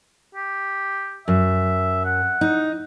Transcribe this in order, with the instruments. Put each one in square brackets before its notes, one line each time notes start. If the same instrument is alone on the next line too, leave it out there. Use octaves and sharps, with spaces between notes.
[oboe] G4
[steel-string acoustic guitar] F#2 [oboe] E5
[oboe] F#5
[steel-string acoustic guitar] D#4